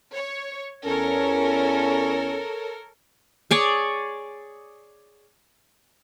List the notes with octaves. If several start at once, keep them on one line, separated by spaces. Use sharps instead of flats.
C#5
E2 C#4 A4 A#4 C#5
G#4 C#5 D5